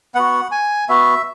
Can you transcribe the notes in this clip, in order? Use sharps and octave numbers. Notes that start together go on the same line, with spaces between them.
B3 F#4 F#5
G#5
B3 F#4 E5